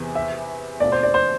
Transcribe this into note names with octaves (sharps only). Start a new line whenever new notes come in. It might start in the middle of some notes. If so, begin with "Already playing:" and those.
Already playing: E2 C3 E3 B3
E5
B2 A3 C4 F4 D5
C5
D5
C5